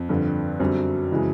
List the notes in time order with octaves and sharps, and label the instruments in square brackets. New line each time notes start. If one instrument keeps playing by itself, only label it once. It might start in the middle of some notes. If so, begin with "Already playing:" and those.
Already playing: [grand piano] F2
[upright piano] G2 D3 F3
[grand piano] F#2 [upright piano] D3 G3 C4
[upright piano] C#3 E3 G#3